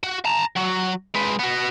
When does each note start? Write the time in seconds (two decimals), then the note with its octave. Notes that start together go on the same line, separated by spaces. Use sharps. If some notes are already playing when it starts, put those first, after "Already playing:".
0.03 F#4
0.25 A5 A#5
0.56 F#3 F#4
1.14 G#3 B4
1.39 B3 F#4